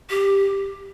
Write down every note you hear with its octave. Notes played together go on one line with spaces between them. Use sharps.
G4